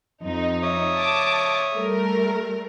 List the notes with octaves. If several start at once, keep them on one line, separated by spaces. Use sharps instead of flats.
F2 D#4
C#5 E5 D#6
A5 D6
G3 A3 A#4